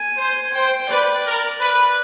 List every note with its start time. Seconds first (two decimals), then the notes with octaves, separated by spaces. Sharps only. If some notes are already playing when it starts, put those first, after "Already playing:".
Already playing: G#5
0.17 C5
0.53 C5 G5
0.89 B4 D5
1.24 A#4
1.60 B4